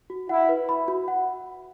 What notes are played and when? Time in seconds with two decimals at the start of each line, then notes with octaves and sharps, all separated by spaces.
0.10 F#4
0.29 E4 F#5
0.49 B4
0.69 B5
0.88 F#4
1.08 F#5